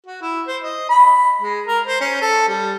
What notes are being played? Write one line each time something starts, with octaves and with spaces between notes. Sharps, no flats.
F#4
E4
C5
D#5
B5
G#3
A#4
C5
C#4
A4
G3